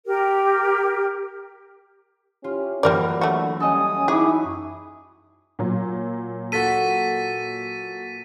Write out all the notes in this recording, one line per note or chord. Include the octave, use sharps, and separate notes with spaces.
G4 A#4
C#4 E4 F4 G4
F#2 A2 E3 F#3 G3 A#3 A#4 D5
D3 A3 F#4
G3 C#4 A4 D#5 G#5 D#6
C#4 D#4 E4 F#4 G#4 C#5 D6 D#6
A#2 F#3
F#4 A4 A6 B6 D#7